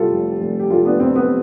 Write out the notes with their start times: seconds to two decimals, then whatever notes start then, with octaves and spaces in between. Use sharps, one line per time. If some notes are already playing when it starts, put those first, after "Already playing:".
Already playing: C3 G3 F4 G4 A4
0.11 F1
0.41 F1
0.59 G4
0.70 F1 F4 A4
0.85 B3 D4
1.00 F2 C4
1.15 B3